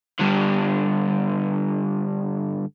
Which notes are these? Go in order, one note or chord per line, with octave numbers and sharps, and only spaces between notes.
G2 D3